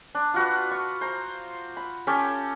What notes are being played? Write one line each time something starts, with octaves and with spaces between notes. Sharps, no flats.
D4
F4 F#4 B4
C#6
C5 A#5
B5
C#4 G4 A4 C#5